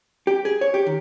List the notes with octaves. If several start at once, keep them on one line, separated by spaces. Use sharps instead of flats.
G4
G#4
C#5
G4
D#3